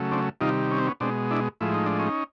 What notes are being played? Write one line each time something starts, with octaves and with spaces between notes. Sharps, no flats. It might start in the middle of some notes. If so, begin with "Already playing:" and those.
Already playing: C#3 F#3 A3
C4 D4
C3 D#3 G3 D#4 F4
C#4
C4
B3 C#4
B2 G#3 C4 D4
D4 E4
A2 F3 G#3 E4
D#4
D4
C#4 D#4